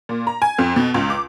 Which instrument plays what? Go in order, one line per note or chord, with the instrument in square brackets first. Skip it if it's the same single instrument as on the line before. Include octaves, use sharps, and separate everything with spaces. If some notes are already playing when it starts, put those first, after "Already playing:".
[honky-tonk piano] A#2
A#5
G#5
F2
B2
C#2
D6